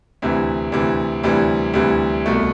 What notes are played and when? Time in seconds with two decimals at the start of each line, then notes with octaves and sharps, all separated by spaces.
0.22 D2 C3 E3
0.72 D2 C3 E3
1.23 D2 C3 E3 G3
1.74 D2 C3 E3 G3
2.26 C2 B2 A3